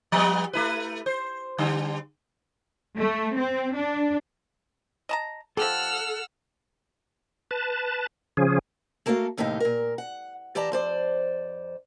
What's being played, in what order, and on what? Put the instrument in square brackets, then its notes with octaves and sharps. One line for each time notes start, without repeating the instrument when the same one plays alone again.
[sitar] F3 G3 B3
A3 E4 B4
C5
D3 G3
[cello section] A3
C4
D4
[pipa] D#5 A5 A#5
[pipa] F3 G4 [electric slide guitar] A4 [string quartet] F#5 E6 F6
[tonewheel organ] B4 A5
C#3 F3 C#4 G#4
[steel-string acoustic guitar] A3 A#3 F#4 A4 D5 F5
D#2 A2 C3 E3 D#4 F5
A#2 A#4
F#5
E3 G4 D5 A5 A#5
F2 C5 D5